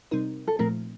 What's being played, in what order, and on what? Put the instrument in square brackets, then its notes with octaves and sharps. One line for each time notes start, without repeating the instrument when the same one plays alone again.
[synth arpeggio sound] C3 G3 C4 D#4 A#4
[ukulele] A4
[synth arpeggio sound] A#2 F3 A3 C4 [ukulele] A#4